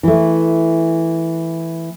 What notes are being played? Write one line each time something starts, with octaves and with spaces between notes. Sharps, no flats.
E3 A3